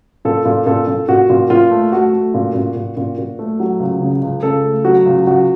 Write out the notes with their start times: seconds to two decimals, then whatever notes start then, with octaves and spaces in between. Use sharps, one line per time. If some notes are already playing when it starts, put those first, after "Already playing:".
0.25 A#2 A4
0.45 A#2
0.66 A#2 A4
0.87 A#2
1.08 A#2 F#4
1.30 A#2
1.50 A#2 F4
1.71 A3
1.92 A3 F#4
2.13 A3
2.34 A#2
2.55 A#2
2.76 A#2
2.97 A#2
3.18 A#2
3.39 A3
3.60 F#3
3.80 C#2
4.01 C#3
4.22 C#2
4.43 C#3 A4
4.64 A3
4.85 F#3 F#4
5.06 C#2
5.27 C#2 F#4